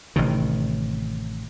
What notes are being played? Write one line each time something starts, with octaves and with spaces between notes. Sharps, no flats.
A1 C3 D#3